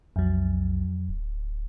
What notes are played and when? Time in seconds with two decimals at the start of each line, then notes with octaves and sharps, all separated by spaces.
0.16 B1 F2 F#3
1.09 D1